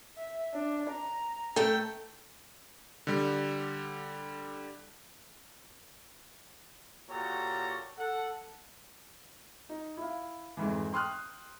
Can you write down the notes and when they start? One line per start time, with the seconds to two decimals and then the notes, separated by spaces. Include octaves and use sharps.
0.17 E5
0.54 D4
0.91 A#5
1.56 A3 A4 G5
3.07 D3 G3
7.10 A#2 F#4 G4 A4 C#5 A#5
7.98 A4 F#5
9.69 D#4
9.97 E4 F5
10.57 F2 G#2 E3
10.93 G5 C6 D#6 F6 F#6